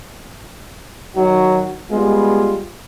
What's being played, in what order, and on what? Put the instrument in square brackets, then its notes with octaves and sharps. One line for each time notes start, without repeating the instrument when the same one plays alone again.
[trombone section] D#3 F#3 D#4 F#4
G3 G#3 B3 F4